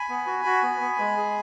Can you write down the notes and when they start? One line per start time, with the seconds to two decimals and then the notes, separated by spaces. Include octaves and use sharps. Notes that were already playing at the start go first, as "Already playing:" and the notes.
Already playing: G#5 B5
0.09 B3
0.27 F#4
0.45 F#4
0.62 B3
0.80 B3
0.99 G#3
1.17 G#4